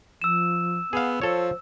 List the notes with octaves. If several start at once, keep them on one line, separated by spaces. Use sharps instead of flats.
F3 E6 E7
B3 G#4 F5 F#5
F3 A4 C5 C#5